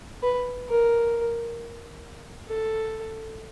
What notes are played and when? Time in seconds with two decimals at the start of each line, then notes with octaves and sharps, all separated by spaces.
0.23 B4
0.68 A#4
2.49 A4